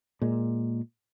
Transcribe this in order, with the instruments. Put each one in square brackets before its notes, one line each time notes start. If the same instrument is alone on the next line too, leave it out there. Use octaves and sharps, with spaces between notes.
[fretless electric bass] A#2 G#3